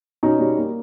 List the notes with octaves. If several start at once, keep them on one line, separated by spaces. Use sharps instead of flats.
B2 C#4 D#4
G3
A#3